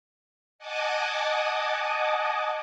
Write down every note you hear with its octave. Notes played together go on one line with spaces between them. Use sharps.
D#5 F#5 G#5 A5 D6 D#6